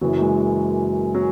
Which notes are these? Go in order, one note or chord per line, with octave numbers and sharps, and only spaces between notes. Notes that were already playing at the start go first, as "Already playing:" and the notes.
F#1 F#2 E3 F#3
G#3
F#3